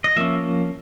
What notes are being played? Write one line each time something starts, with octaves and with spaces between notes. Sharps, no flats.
D#5
F3 A#3 C#4 E5